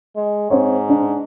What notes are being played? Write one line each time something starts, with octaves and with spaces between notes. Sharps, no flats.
G#3
G#2 C4 C#5
D4